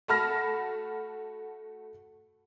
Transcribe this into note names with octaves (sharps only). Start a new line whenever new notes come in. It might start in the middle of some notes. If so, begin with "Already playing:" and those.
A3 F#4 A5 B5 F6 A#6